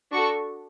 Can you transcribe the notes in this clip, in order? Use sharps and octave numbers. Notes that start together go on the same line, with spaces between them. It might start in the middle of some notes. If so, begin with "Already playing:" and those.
D4 F#4 A4 C#6